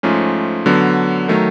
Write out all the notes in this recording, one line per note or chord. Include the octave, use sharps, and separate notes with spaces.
G#2 F3 A3 C#4
D3 F#3 B3
D#3 F#3 A3